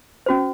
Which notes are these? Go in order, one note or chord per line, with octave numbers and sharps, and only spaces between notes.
C#4 F#4 C5